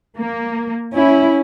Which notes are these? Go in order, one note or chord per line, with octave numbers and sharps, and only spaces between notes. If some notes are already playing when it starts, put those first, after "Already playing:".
A#3
C#4 E4